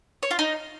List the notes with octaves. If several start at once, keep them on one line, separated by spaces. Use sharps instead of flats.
C#5
F4
D#4